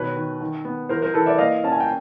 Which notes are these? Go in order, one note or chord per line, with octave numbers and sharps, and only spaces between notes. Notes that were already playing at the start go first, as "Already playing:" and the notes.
Already playing: B2 D#3 B4 C#5
D#3
D#3
B3
E3 A#4 C5
A#4 C5
E3 A4 B4
D5 E5
A#3 D#5 F5
C#4 A5
G#5
G5